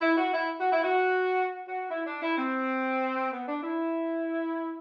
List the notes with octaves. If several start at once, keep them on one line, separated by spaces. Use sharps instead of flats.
E4
F#4
E4
F#4
E4
F#4
F#4
E4
D4
E4
C4
B3
D4
E4